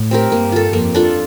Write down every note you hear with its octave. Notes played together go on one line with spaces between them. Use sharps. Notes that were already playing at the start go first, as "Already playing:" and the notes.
Already playing: A2
C4 G4 A#4
G2 A#3
F4 A4
F2 A#3
D4 F4 A4